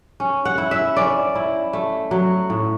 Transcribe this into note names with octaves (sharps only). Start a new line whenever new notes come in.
C#4
F#5
E4
E5
C#4 D5
E4
A3
F#3
A2